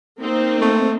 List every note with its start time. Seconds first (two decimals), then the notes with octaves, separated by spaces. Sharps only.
0.22 A#3 C4 D#4
0.62 A3